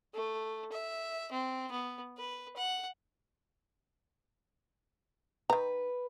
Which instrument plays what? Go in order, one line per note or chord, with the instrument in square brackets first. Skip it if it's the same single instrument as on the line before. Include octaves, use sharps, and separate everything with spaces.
[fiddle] A3
E5
C4
B3
B4
F#5
[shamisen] D#3 A#5 [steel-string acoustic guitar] B4